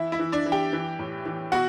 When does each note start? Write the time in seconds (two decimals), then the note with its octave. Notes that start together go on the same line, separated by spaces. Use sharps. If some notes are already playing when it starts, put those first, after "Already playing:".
Already playing: E3 E4 E5
0.12 E4 E5
0.19 E3
0.32 D4 D5
0.46 E3
0.52 G4 G5
0.73 E3
0.99 A2
1.26 E3
1.52 B2 F#4 F#5